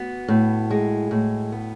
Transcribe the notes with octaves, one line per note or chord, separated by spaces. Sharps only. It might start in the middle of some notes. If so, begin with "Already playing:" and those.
Already playing: B3 F#4
A2
G#3
A2
B3